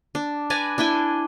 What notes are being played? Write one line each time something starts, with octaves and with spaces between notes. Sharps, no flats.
D4
B4 D5 G#5 A#5
D4 E4 G5 G#5